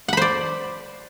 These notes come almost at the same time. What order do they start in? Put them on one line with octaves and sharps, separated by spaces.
F#5 B5 C5 D5